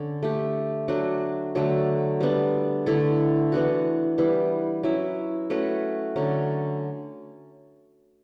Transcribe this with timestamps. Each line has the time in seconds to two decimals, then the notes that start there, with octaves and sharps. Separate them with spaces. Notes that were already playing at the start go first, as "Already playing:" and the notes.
Already playing: D3 C#4
0.23 A3 D4 G4
0.88 F#3 A3 D4 F#4
1.55 D3 F#3 A3
2.21 G3 B3 D4
2.86 D3 A3 E4 A4
3.52 E3 B3 D4 F#4
4.18 E3 G3 B3
4.83 F#3 C#4 E4
5.50 A3 C#4 F#4 B4
6.16 D3 F#3 C#4